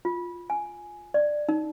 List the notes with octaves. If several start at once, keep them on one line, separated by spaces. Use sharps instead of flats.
F4
G#5
D5
D#4